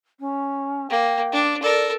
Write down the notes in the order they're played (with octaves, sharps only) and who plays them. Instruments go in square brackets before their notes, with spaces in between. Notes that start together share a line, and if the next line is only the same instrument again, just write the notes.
[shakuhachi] C#4
[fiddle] A#3 [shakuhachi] G5
[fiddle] D4
[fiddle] A4 A#4 [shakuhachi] D5